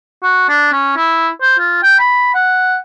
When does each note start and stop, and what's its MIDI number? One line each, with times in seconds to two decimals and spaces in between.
0.23 0.45 66
0.49 0.70 62
0.73 0.92 61
0.97 1.29 64
1.41 1.56 72
1.59 1.83 65
1.83 1.97 79
1.99 2.33 83
2.34 2.77 78